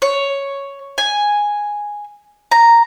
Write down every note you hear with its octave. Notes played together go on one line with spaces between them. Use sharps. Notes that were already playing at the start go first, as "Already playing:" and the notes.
C#5
G#5
A#5